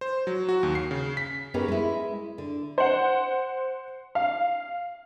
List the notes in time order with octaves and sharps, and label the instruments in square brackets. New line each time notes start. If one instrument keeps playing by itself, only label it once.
[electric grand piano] C5
F#3
F#4
D#2
C7
C#3
B6
[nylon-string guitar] B3 C#4 D#4 G4 G#4 A#4
G#3 E4
D3
[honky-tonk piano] C5 F#5
F5